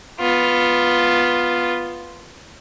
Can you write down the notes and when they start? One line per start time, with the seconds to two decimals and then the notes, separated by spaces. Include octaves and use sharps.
0.19 B3 F4